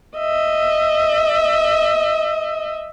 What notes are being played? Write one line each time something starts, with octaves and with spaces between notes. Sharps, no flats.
D#5 E5